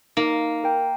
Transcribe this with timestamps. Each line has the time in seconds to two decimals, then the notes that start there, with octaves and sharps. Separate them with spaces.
0.17 A#3 D#4
0.64 A#4 G5